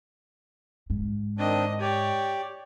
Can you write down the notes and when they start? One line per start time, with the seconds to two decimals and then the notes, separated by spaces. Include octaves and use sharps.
0.90 G#2
1.39 D#3 C4 D4 D#5
1.80 G4 C#5 D5